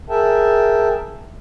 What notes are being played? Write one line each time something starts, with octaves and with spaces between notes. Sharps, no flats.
G#4 A#4 E5 G5 A5